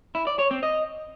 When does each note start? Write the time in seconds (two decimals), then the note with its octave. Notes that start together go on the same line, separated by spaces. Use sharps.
0.15 E4
0.27 D5
0.39 C#5
0.51 C4
0.63 D#5